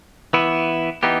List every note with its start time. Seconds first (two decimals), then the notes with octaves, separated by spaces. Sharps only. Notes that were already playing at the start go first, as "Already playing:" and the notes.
0.33 E3 B3 E4
1.03 E3 B3 D#4 G4